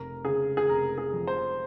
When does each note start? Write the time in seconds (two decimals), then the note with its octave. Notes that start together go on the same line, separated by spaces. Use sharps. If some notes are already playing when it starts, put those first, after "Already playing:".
Already playing: F1 A#4
0.25 C#3 G#4
0.57 G#4
0.68 F1 A#4
0.98 G#4
1.13 F2
1.27 C5